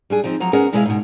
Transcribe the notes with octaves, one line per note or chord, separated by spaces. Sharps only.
G3 D4 G#4
F3 C4 D#4
F3 F#3 A#5
B3 C#4 G#4 A#4 F#5 A#5
B2 G#3 E4 G#4 B4 F5
G#2 B2